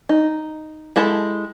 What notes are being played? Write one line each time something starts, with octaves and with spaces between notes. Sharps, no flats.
D#4
G#3 E4 G4 A4 A5